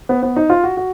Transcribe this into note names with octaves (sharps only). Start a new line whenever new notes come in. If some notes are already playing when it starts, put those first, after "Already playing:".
B3
B3
D#4
F4
F#4
F#4